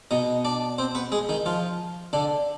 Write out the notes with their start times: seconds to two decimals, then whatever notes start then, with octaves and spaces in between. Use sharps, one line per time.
0.11 B2 B3 D#4 D#5
0.45 D4 D5
0.78 C4 C5
0.95 B3 B4
1.12 G#3 G#4
1.29 D#3 D#4
1.46 F3 F4
2.13 D3 D4